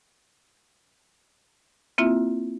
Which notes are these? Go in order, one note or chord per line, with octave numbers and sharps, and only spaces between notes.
A#3 C4 E4 F4 E5